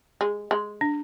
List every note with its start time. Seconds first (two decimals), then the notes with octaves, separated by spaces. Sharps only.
0.21 G#3
0.51 G#3
0.81 D4